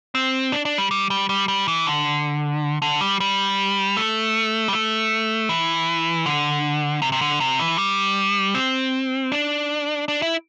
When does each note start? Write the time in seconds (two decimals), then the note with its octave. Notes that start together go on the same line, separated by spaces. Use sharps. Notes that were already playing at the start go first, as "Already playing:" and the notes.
0.15 C4
0.52 D4
0.65 D4
0.78 G3
0.91 G3
1.10 G3
1.29 G3
1.48 G3
1.68 E3
1.87 D3
2.82 D3
3.01 G3
3.20 G3
3.97 A3
4.68 G3
4.73 A3
5.49 E3
6.26 D3
7.02 C3
7.12 C3
7.21 D3
7.40 C3
7.60 E3
7.78 G3
8.54 C4
9.32 D4
10.08 D4
10.22 E4